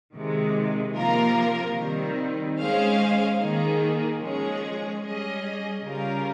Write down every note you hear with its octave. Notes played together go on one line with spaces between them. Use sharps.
C3 D#3 G#3
C3 F3 A#3 F4 A#4
D#3 G3 C4
G#3 C#4 G#4 C5 F5
D#3 A#3 D#4 G#4
F3 G#3 C#4 G#4
G3 C#4 G#4 D#5
C#3 G3 C#4 F4 A#4